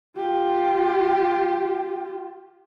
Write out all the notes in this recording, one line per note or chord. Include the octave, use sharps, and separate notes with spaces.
F4 G4